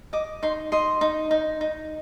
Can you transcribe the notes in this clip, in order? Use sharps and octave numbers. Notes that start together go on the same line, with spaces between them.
D#5 D6
D#4 C6
D#5 C6
D#4
D#4
D#4